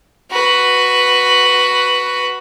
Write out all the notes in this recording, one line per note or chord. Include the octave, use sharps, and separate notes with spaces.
F#4 B4